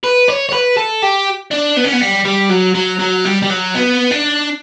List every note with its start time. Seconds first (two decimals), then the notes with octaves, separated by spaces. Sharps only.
0.04 B4
0.28 C#5
0.49 C#5
0.53 B4
0.77 A4
1.02 G4
1.51 D4
1.77 B3
1.84 C#4
1.93 B3
2.01 G3
2.25 G3
2.50 F#3
2.75 F#3
3.00 F#3
3.25 G3
3.42 G3
3.50 F#3
3.75 B3
4.11 D4